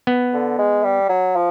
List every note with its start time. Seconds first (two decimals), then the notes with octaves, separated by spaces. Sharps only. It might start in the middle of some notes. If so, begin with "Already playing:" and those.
0.07 B3
0.33 D3
0.58 G#3
0.84 G3
1.09 F#3
1.35 F3